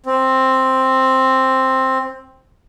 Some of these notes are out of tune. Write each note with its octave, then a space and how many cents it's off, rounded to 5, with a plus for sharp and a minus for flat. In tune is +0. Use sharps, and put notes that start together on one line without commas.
C4 +5